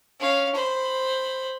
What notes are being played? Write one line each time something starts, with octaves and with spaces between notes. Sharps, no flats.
C#4 F5
C5 B5